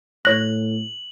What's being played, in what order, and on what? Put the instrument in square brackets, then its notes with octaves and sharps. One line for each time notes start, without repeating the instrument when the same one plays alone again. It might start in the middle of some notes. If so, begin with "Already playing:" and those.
[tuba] A2 [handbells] C#5 A#6 [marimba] F#6 [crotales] F#7